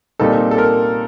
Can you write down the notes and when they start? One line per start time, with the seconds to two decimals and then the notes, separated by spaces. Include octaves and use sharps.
0.19 A#2 G3 C4 D#4 A4
0.51 A4
0.58 A#4